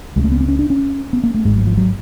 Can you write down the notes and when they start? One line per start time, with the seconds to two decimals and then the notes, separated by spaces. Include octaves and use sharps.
0.16 C#2 G#3
0.19 C#3 A3
0.32 B3
0.41 C4
0.48 C#4
0.59 D4
0.70 C#4
1.13 B3
1.24 A#3
1.34 A3
1.45 G#1 G#2 G#3
1.56 F#3
1.67 F3
1.77 F#3